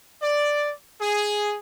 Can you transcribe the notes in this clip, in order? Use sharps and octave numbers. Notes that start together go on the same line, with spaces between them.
D5
G#4